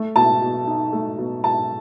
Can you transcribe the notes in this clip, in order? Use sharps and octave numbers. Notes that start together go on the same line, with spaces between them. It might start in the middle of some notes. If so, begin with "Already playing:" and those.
Already playing: A3
B2 A5
B2
D#4
A3
B2
B2 A5